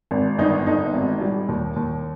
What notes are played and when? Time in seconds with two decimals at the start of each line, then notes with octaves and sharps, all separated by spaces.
0.11 G#1
0.38 G1 D#4
0.66 G1 D#4
0.94 G#1
1.21 G3
1.48 D#2
1.76 D#2